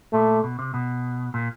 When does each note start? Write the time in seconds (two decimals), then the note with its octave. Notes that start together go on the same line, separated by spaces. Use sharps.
0.13 A#2 A3
0.44 B2
0.59 C3
0.74 B2
1.34 A#2